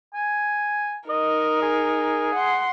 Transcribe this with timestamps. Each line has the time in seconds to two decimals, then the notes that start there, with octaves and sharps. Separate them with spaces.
0.14 G#5
1.09 D#4 A#4 D#5
1.62 G#4
2.34 F#5 C6